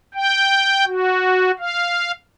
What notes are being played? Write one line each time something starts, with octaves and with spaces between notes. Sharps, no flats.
G5
F#4
F5